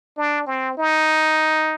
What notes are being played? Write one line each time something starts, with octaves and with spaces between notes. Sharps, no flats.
D4
C4
D#4